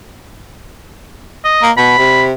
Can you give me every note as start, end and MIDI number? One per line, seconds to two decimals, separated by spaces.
1.45 1.67 75
1.62 1.72 58
1.77 1.95 47
1.77 2.24 83
1.98 2.32 48